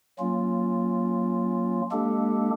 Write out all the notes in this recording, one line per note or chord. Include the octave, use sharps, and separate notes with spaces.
F#3 A#3 C#4 F4
G#3 A#3 D4 G4 A4